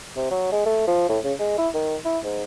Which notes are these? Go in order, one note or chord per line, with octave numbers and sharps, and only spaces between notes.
C3
F#3
G#3
A3
F3
A2
C#3
G#3
E4
D#3
E4
G#2